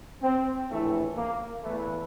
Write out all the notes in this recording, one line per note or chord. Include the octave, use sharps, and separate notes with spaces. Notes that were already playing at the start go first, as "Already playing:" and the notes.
C4
A#1 A2 E3 A3
A#3
E2 E3 A3